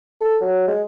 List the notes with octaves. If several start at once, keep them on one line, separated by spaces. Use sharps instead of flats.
A4
F#3
G#3